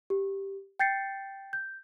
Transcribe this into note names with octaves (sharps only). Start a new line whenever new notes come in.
G4
G5 G6 A6 C7 C#7
G6